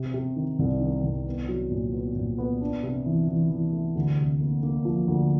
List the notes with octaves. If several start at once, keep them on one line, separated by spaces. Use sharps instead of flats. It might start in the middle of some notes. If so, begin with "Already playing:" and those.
Already playing: C3
C3
D#3
C2
D#3
C2
B3
F#3
A#2
B3
A#2
B3
D4
C3
E3
E3
E3
A3
D2
C3
A#3
A#3
F3
D2